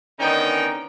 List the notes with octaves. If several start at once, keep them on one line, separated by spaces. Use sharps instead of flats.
D3 D#3 B3 C#4 D#4 G5